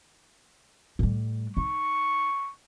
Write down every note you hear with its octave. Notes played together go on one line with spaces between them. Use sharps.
A2 G3
D#4 C#6